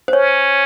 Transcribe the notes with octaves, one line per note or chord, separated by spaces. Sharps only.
C5
C#4 C#5